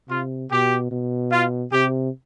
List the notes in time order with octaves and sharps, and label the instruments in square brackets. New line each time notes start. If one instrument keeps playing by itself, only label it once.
[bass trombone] C3 [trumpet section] F4
[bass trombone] B2 [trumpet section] G4
[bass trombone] B2
[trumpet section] F4
[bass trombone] C3 [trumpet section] G4